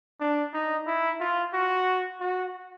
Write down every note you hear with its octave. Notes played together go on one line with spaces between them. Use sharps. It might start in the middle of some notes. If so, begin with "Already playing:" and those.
D4
D#4
E4
F4
F#4
F#4